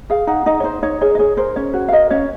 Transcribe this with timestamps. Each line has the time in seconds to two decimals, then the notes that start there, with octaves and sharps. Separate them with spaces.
0.10 G#4 F5
0.27 D#4 F#5
0.46 D#4 D#5
0.60 C#5
0.64 D#4 C5
0.82 D#4 C#5
1.01 G#4 C#5
1.15 D#5
1.19 G#4 C#5
1.37 A#4 C5
1.56 C#4 C#5
1.74 F#4
1.88 F5
1.92 A#4 D#5
2.10 C#4 C#5